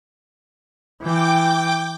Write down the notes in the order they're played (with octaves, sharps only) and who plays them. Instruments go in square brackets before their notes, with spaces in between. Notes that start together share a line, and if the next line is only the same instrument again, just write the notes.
[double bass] E3 [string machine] G5 D6